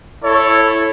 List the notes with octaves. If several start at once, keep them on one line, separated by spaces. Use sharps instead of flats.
E4 A4 C#5